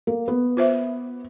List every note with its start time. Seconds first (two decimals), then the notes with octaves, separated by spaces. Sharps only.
0.07 A#3
0.28 B3
0.57 F4 C5 E5